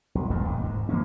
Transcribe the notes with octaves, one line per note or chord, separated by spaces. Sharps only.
B1
D#1 A1 E2 G2
D#2
G#2
E3 A#3 C4 C#4